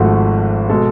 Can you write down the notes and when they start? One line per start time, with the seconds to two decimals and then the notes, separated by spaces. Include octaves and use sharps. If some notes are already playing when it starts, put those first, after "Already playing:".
Already playing: G#1 G#2 F3 A3 F#4
0.70 B2 G#3 A4